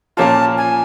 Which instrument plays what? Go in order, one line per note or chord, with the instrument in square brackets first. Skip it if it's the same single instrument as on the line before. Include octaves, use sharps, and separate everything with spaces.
[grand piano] A#2 F3 A#3 C#4 F4 [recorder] A5
[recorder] G#5